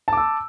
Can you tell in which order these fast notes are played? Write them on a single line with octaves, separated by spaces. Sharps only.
A5 D6 E6